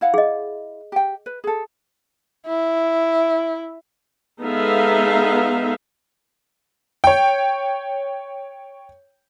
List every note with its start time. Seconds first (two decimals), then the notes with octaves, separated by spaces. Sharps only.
0.01 E4 F5 F#5
0.14 G#4 D#5
0.92 G4 G5
1.26 B4
1.44 G#4 A4
2.46 E4
4.42 G#3 B3 D#4 A4 E5 F5
7.04 C#5 G5